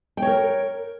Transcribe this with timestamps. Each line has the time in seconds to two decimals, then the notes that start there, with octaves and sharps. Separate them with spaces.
0.17 G5
0.22 C#5
0.27 A#4